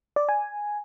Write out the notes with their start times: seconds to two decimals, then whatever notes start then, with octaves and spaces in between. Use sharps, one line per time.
0.16 D5
0.29 G#5